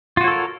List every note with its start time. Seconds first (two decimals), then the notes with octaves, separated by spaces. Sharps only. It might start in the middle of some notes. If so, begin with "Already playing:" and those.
0.17 F4
0.21 F#4
0.24 C#5
0.28 A4
0.31 A#4